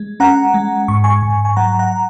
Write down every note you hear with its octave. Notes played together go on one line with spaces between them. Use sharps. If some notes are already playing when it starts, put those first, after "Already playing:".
Already playing: G#3
C#4 F#5 A#5
G#3
G#2 C#6
G#5 C#6
G#2
G#5
F#3 F#5 A#5
F#5 A#5